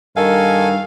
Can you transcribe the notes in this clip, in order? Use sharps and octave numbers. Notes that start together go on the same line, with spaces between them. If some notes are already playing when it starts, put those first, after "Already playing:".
G2 D#3 A4 F5 G#5